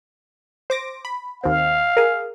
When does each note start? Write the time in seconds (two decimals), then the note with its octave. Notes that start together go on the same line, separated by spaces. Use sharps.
0.70 C5 D6 A#6
1.05 B5
1.44 D#2 C4 F5
1.97 G#4 A#4